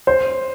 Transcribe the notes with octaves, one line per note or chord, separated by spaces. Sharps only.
C5